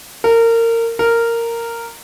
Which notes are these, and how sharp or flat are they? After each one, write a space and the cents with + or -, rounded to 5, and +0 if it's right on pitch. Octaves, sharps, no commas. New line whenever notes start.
A#4 -25
A#4 -10